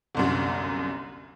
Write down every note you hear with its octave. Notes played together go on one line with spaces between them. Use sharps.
G1 C2 F#2